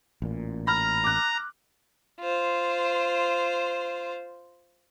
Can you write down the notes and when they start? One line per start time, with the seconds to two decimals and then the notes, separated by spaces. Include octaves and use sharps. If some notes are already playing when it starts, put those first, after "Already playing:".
0.22 A1 A#2
0.67 A#5 B5 F6
1.04 D6 F#6
2.21 F4 C5